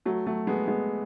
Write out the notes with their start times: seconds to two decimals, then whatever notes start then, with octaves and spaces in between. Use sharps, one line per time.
0.06 F#3 A3
0.26 F#3 A3
0.47 G#3 B3
0.67 G#3 B3